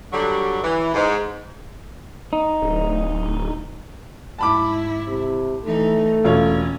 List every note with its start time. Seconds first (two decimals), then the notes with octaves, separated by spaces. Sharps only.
0.11 D3 F#3 G3
0.62 E3
0.93 G#2
2.33 D#4
2.62 D1
4.39 G#2 E4 A5 B5 D6
5.07 C3
5.65 E3 A3 D#4
6.25 E1 C#4 F4 C#5